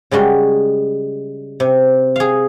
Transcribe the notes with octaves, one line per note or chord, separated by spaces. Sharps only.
C#3 G3 G#3 F#4
C3
G#4 F5